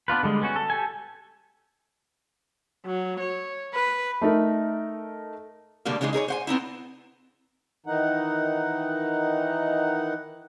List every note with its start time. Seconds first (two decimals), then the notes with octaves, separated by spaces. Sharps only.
0.08 B3 D4 F4 B4
0.23 D3 G3 G#3
0.42 B3 C#4 F#4
0.56 A4
0.70 G4 A4 G#5
2.86 F#3
3.20 C#5
3.74 B4
4.21 A3 D#4 A#4
5.85 B2 D3 G3 A3 A#3
6.01 C#3 E3 G#3 D#4 G#4
6.13 D#4 G#4 A#4 C#5
6.28 C5 F#5 G#5
6.47 B3 C4 D#4 E4
7.86 D#3 E3 D#4 F#5